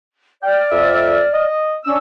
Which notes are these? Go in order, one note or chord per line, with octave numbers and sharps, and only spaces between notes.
D5 G5 F6
F2 E5
D#5
C#4 D4 E6